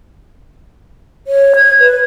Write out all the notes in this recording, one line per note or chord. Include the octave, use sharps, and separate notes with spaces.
C#5
G#6
B4